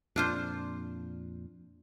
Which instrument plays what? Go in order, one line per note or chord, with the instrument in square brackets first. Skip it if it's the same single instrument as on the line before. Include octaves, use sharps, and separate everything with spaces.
[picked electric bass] F2 A#2 [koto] D4 F4 C5